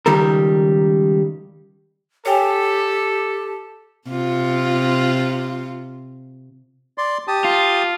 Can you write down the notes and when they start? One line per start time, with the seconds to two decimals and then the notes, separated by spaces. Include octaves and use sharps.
0.06 C#2 D#3 G3 A4 A#4
2.26 G4 A4 C#5 G5 G#5
4.08 C3 F4
6.98 D5 C6
7.28 G4 A5 D#6
7.44 F4